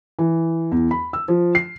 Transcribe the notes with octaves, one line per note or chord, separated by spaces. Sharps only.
E3
E2
B5
E6
F3
C7